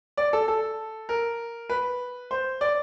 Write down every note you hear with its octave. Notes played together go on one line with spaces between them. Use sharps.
D5
A4
A4
A#4
B4
C5
D5